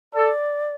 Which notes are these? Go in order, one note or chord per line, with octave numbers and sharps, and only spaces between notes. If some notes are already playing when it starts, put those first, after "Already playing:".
A4 D5